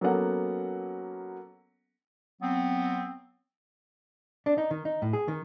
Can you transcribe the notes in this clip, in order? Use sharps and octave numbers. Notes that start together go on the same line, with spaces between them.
F#3 A#3 B3 C#4 A4 F#5
F#3 B3 C4
D4
D#4
D#3
D#4
A2
G#4
D#3